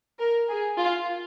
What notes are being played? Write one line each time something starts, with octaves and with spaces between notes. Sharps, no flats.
A#4
G#4
F4